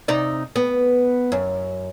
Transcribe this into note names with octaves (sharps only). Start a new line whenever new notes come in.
C3 D#4 D5
B3
F#2